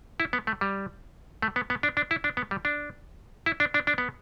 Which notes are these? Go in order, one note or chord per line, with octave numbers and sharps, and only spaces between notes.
E4
B3
A3
G3
A3
B3
B3
D4
D4
E4
D4
B3
G3
D4
E4
D4
D4
D4
B3